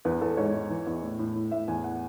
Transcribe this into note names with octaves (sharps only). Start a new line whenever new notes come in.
E2 B4
E2 A4
G#2 C#5
G#2
E3
E2
A2
A2
A2
A2 E5
E2 G#5
F#5